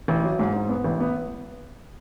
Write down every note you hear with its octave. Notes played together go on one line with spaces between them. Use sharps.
A1
F#3
G#2
G#2
B3
A1
B3